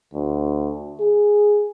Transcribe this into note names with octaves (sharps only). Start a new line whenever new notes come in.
D2
G#4